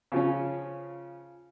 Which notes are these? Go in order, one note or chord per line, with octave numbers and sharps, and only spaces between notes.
C#3 F3 C#4